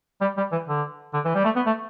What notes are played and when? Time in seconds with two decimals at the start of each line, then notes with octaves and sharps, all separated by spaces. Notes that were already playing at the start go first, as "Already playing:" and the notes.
0.21 G3
0.37 G3
0.52 E3
0.68 D3
1.14 D3
1.25 E3
1.35 G3
1.44 A3
1.56 B3
1.66 A3